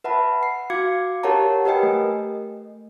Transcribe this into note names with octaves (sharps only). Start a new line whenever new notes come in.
B4 E5 F#5 A5 B5
C7
F#4 F5 D6 G#6 C#7
G4 A#4 C#5 F#5 A5 A#5
G4 A#4 B4 D#5 G5 G#5
A3